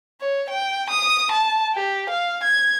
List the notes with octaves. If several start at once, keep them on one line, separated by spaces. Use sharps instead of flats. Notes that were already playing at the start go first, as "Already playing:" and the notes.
C#5
G5
D#6
A5
G4
F5
G#6